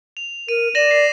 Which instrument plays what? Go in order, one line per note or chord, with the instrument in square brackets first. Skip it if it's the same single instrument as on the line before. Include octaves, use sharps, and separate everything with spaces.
[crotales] F7
[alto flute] A#4 [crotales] D#7
[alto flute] D5 [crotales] A#6 E7 F#7
[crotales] C7